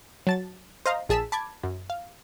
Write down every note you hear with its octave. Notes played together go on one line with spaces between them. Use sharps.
F#3 A5 A6
C5 D#5 F5 A#5
A#1 G#4 A5 E6 B6 E7
A5 B5 D6 G#6
F#2
F5